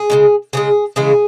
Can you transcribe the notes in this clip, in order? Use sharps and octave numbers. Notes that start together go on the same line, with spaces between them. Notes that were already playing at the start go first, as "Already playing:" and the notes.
Already playing: G#4
C#3 E3 G#3
C#3 E3 G#3 G#4
C#3 E3 G#3 G#4